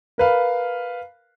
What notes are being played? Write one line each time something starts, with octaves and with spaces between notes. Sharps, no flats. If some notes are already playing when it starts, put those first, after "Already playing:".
A#4 B4 F5